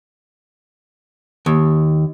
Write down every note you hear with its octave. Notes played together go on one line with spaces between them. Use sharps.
D#2